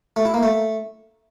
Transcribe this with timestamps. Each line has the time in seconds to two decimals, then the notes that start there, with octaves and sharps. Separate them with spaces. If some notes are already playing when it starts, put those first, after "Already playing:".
0.16 A3
0.25 E4
0.34 A#3
0.43 A3